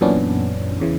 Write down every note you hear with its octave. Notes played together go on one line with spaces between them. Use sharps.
F#2 A#2 E3 B3 C#4 D4
E2 C#3 E3